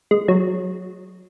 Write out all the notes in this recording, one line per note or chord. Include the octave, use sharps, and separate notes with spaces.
G#3
F#3